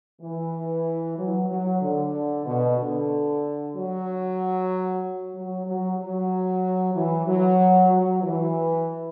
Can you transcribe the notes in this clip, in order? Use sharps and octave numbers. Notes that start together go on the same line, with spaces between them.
E3
F#3
F#3
D3
B2
D3
F#3
F#3
F#3
F#3
E3
F#3
F#3
E3